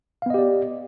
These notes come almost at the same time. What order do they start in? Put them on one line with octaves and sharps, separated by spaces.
F5 B3 D#5 G4 D5